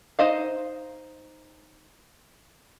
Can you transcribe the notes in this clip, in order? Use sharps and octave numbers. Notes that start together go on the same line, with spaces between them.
D#4 C5 D#5 F5